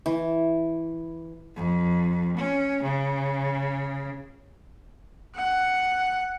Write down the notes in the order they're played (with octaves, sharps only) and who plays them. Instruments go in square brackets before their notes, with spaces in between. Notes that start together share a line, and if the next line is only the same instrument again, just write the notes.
[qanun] E3
[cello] F2
C#4
C#3
[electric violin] F#5